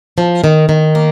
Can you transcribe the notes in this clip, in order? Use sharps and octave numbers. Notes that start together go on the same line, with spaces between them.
F3
D#3
D#3
A#3